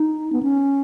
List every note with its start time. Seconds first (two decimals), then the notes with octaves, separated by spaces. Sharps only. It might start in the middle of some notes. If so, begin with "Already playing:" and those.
Already playing: D#4
0.33 B3
0.43 C#4